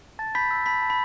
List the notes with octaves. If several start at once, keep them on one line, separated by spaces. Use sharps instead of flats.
A5 A6
B5 G6 B6
E6
A5 B5 B6
A5
B5